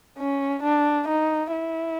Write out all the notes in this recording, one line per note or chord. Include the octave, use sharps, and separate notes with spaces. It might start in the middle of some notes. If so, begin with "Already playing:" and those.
C#4
D4
D#4
E4